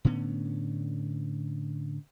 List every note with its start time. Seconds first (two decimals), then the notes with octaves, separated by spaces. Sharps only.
0.05 A2 D3 B3 C#4